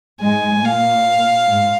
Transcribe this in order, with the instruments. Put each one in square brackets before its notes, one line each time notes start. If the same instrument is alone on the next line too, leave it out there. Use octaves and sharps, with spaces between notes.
[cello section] G#2 G#3 [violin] G#5
[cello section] A#2 A#3 [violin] F5
[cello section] G#2 G#3